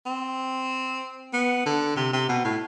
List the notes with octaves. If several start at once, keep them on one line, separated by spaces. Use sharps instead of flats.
C4
B3
D3
C3
C3
B2
A2